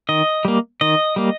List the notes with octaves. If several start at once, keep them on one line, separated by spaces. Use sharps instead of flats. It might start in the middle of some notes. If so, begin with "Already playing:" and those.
D#3 D#5
G3 A#3
D#3 D#5
G3 A#3